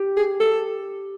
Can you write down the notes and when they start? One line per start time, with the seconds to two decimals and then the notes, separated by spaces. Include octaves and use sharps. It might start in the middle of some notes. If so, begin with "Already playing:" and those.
Already playing: G4
0.17 G#4
0.40 A4